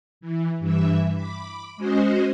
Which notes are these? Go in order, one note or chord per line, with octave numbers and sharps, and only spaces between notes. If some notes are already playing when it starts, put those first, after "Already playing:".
E3
G2 E3 E5
B5 D6
G#3 C#4 F#4 C5 D#5